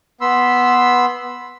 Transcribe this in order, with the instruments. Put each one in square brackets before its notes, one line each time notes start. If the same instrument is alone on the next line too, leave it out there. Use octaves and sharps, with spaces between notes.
[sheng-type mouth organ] B3 B5 C6 E6